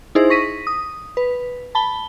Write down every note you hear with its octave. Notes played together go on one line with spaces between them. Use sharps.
D#4 E4 G#4 C5
C#6 A#6 B6 D#7
D#6
B4
A5 B5 G7